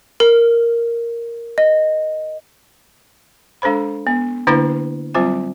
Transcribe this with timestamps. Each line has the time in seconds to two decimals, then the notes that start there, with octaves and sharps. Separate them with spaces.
0.20 A#4
1.58 D#5
3.62 G#3 D4 A4 C5 B5
4.07 B3
4.47 D3 A#3 D4 E4 B4 C6
5.14 F#3 G3 C4 F4 C5 G#5